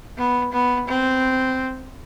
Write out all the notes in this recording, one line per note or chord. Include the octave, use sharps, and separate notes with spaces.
B3
B3
C4